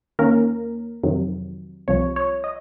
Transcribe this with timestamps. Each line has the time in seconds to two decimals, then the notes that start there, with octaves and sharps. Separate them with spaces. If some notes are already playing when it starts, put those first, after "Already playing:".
0.19 D#2 D#3 A#3 C#4 A#4
1.03 F2 C3 D#3 F#3
1.88 C2 C3 F3 C#5
2.16 C#5
2.44 D#5